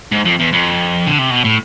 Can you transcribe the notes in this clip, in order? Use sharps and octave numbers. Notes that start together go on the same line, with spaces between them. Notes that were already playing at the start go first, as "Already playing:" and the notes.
G#2
F2
E2
F2
D3
C3
B2
A2